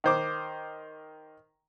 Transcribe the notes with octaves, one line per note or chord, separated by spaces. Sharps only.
D#3 C5 D6